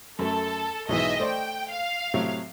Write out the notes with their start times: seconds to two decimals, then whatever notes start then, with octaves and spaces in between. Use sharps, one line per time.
0.19 F#2 A3 A4
0.89 B1 G#2 E3 D#5 E5
1.20 A3 C5 D5 G5
1.71 F5
2.14 A2 C3 F#3